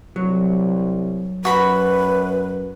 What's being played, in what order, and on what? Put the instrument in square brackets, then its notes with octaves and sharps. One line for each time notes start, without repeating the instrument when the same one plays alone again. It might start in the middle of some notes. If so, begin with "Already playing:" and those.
[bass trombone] C2 [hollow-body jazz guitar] F#3
[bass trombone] F#2 [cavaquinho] F#4 B5 [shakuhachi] B4